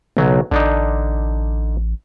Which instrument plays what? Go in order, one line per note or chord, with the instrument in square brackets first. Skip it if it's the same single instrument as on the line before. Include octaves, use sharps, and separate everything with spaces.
[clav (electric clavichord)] B1 F#3 [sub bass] C#3
[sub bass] A1 [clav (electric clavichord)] D3 D4 D#4